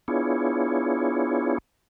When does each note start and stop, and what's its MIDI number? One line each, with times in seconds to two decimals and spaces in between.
0.08 1.58 59
0.08 1.58 62
0.08 1.58 64
0.08 1.58 65
0.08 1.58 68
0.08 1.58 73